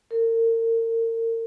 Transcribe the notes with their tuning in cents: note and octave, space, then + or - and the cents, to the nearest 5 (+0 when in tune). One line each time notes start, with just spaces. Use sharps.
A#4 -35